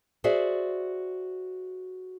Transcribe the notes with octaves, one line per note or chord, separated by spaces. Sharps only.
F#4 G#4 C5 D5 E5